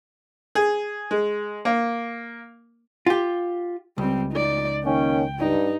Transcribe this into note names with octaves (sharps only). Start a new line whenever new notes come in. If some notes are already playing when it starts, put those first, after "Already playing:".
G#4
G#3
A#3
F4 G4
C#2 G3 C4
D#4 D5
D#3 A#3 C#4 G5
G2 D#4